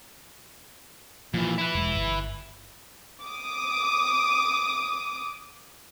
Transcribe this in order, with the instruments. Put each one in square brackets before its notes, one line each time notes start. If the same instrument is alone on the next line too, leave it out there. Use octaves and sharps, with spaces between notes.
[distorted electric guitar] A#2 E3 [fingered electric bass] F3
[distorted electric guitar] E4 B4
[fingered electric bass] E1 G#3
G1
[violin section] D6 D#6